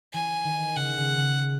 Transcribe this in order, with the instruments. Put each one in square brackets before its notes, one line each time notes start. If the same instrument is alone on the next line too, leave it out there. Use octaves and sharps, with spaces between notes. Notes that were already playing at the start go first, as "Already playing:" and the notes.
[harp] E3 [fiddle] G#5
[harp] D#3
[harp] C#3 [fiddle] F#5
[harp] C#3
C#3